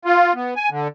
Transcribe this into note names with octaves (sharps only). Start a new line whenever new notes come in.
F4
B3
G#5
D3